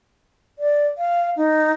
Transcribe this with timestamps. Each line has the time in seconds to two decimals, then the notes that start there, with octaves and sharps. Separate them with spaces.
0.59 D5
0.98 F5
1.37 D#4